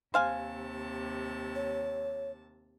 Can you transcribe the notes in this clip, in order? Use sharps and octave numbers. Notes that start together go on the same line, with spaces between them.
D#2 C3 C5 F5 G#5 A5
C#5